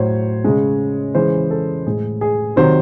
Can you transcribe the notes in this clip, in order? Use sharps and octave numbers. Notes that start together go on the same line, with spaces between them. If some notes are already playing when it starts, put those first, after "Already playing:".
Already playing: A2 F#3 C5 C#5
C#3 G#3
C#3 E3 G#3 C5
A4
A2 G#3 G#4
G#4
C3 D#3 F#3 C5